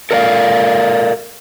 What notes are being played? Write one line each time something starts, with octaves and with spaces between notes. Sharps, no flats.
A4 A#4 D5 F5